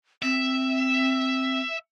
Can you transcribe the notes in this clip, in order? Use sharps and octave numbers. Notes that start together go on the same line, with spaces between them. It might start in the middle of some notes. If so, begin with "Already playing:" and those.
C4 E5